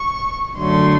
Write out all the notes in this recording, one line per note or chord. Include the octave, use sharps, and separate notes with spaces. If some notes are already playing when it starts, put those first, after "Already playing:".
Already playing: C#6
F#2 D3 F#3 A3 C6